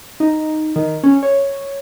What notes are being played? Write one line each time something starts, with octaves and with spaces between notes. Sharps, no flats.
D#4
D#3
C#4
C#5